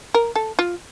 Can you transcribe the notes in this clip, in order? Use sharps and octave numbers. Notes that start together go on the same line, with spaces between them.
A#4
A4
F4